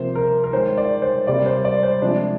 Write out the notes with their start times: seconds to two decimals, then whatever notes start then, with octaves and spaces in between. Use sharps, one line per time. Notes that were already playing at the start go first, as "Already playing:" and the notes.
Already playing: C3 F3 A#3 C5
0.15 A#4
0.44 A#4
0.53 D#3 G#3 C5
0.78 D5
1.02 C5
1.27 C3 G3 A#3 D5
1.46 C5
1.65 D5
1.83 C5
2.02 C3 F3 G#3 D4